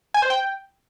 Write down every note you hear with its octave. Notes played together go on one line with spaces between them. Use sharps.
G#5
C5
G5